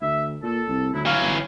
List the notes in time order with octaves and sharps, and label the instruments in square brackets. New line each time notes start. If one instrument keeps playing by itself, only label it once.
[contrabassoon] D2 [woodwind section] E5
[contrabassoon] A#2 [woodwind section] A4
[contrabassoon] C2
[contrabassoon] D2 [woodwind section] F#3 E4
[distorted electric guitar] E3 F#3 [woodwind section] F5
[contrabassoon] G1